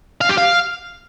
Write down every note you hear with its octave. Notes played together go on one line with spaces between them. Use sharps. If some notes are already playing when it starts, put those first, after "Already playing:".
F5
G4
F5